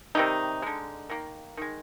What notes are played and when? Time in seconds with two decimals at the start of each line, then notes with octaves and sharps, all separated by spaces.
0.15 C3 D#3 G3 D#4
0.62 D3 G#3
1.10 D#3 A#3
1.57 D#3 G#3